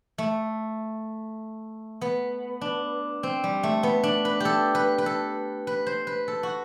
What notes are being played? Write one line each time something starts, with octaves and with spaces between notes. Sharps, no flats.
A3
B3
D4
C4
G3
A3
B3
D4
B4
G4 A4
B4
B4
A4
B4
C5
B4
A4
F#4